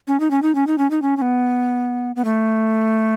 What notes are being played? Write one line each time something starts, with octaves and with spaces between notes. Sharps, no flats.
C#4
D#4
C#4
D#4
C#4
D#4
C#4
D#4
C#4
C#4
B3
B3
A3